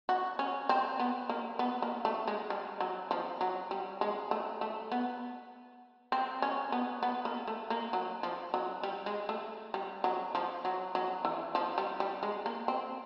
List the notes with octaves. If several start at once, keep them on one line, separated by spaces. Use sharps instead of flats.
F#4
C#4
C4
B3
A#3
B3
A#3
A3
G#3
G3
F#3
F3
F#3
G3
G#3
A3
A3
B3
C4
C#4
B3
B3
A#3
A3
A#3
F#3
F3
F#3
G3
G#3
A3
G3
F#3
F3
F#3
F#3
E3
F3
G3
G3
G#3
A#3
C4